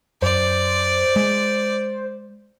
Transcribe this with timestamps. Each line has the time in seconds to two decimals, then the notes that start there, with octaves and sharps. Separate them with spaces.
0.22 F#2 C5 D5
1.16 G#3